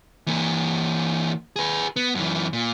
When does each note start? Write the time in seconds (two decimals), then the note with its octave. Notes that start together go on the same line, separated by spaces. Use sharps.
0.27 E3 A#3
1.56 G#4 B4
1.96 B3
2.15 F#2 E3
2.53 A#2